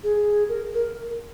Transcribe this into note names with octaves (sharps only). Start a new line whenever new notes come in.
G#4
A#4
A#4